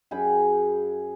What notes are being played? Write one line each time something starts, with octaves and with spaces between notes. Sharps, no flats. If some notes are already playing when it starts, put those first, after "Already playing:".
F#2 G#4 G5 B5